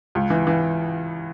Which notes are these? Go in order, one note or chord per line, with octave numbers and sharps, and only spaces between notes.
C#2
E3
E3